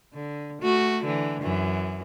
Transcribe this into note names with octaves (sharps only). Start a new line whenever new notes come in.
D3
A3 F#4
D3 E3
F#2 E3